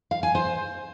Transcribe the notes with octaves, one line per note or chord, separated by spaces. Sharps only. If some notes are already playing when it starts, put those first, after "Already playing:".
F5
G#5
C5